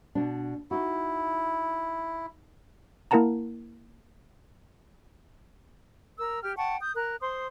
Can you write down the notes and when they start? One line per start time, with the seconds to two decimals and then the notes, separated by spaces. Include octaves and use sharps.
0.15 B2 D4
0.71 D#4 E4 F#4
3.11 A#3 E4 A#4 F#5 A5 A#5
6.19 A#4 E6
6.43 G4 G5 F6
6.57 F#5 G5 A5 C#6
6.81 D#6 G6
6.95 A#4 F#6
7.21 C5 C6 D#6